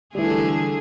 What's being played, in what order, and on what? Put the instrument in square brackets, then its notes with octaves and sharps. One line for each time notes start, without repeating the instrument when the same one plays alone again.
[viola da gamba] D3 A3 G#4 [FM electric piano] E3 G3